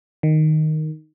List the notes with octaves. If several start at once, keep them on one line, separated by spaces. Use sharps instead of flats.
D#3